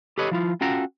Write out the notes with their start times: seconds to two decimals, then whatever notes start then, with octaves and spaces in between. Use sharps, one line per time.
0.18 G4 A4 B4 C#5 D#5
0.31 F3 E4 F4
0.61 C#4 F4 F#4 A4 G5 A#5